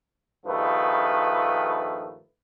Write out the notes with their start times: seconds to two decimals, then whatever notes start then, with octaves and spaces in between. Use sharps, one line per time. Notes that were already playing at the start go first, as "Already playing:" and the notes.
0.46 A#1 G2 D#3 F3 A3 B4